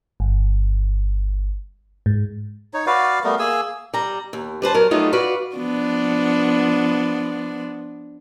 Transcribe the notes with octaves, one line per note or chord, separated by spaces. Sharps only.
G1
G#2
D#4 C#5
F#4 B4 D5 F5
G3 A3 B3 A#4
A#3 G#4 G#5 E6
G3 A#5
D#2
G3 B4 C5 A5
F#3 A#4
F#3 G3 A3 B3 D#4 F4
F#4 B4 D5 F5
F3 B3 D4